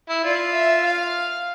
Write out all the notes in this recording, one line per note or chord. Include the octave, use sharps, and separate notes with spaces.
E4
F4 D5
E5
F5